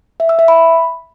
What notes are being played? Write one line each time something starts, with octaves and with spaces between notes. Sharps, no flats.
E5
E6
E5
B5